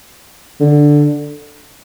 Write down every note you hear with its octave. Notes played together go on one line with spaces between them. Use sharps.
D3